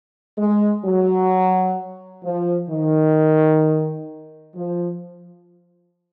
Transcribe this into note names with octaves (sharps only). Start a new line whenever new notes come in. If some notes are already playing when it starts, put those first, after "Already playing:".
G#3
F#3
F3
D#3
F3